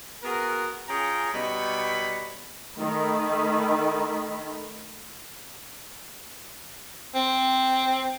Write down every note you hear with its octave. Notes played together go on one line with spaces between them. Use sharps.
B3 F#4 G#4 A#4
C#4 F4 G#4 G5 A#5
B2 G3 D#4 C#5 B5
D#3 A3 B5
C4